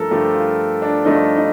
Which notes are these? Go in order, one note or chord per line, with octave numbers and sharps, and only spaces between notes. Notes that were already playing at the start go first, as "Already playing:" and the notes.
Already playing: G2 F3 A3 A4 A#4
G2 F3 A3 G4
F4
D4
G2 F3 A3 D#4
D#4